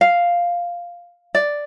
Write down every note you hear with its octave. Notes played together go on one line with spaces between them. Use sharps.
F5
D5